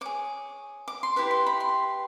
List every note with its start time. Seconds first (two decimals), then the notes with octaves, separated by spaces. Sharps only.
0.01 G#4 C#5 D6
0.88 D6
1.03 C6
1.16 E4 G4 B4 B5
1.31 C6
1.47 B5
1.60 C6